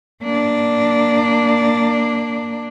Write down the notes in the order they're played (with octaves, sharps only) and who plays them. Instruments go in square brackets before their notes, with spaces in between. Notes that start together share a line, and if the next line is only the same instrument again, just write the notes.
[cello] A#3 D4